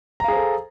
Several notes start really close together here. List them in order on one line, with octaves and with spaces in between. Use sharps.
A#5 F5 G#4 C5 A4